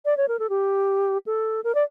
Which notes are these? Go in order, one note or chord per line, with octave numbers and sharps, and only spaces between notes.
D5
C#5
A#4
A4
G4
A4
A#4
D5